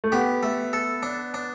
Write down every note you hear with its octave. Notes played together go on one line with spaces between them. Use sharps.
A3
B3 G4
A3
A4
D4
D4